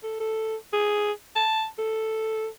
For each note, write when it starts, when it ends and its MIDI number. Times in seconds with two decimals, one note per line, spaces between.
0.03 0.19 69
0.20 0.56 69
0.73 1.12 68
1.35 1.66 81
1.78 2.48 69